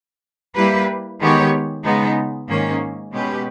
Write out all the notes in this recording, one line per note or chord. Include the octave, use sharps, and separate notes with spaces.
G3 A#3 E4 G4 B4
D#3 G#3 B3 G4 C#5
C#3 G#3 B3 D#4
G#2 D#3 A#3 C#4
B2 G#3 C#4 G4 B4